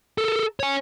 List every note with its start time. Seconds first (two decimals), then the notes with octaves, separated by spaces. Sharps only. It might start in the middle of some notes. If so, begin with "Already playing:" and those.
0.18 A4 A#4
0.60 C#5 G#5